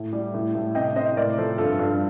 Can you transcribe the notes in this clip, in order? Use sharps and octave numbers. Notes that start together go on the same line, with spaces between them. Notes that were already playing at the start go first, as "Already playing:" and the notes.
Already playing: A2
G3
A2
A2
C3 D#5 G5
C3 C5 D#5
A2 A#4 D5
F3 A4 C5
G2 F4 A4
G2 F4 A4